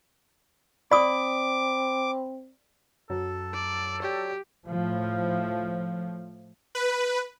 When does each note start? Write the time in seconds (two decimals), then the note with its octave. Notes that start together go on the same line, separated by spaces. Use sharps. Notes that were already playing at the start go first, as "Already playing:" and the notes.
0.91 C4 D5 B5 D6 D#6
3.10 F#2 F#3 A4
3.53 D5
4.02 G4 C#5 D5 G5
4.67 A2 F3
6.75 B4